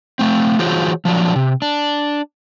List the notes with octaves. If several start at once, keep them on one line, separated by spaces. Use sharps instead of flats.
A3 C4
E3 F4 F#4 G#4 C5 C#5
F3 F#3 D4
C3
D4